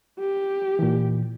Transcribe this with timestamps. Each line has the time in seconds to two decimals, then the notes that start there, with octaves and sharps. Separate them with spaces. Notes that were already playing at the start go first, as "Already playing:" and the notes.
0.20 G4
0.79 A#2 E3